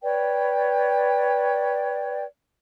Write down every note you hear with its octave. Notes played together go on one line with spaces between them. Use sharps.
B4 C#5 D5 G5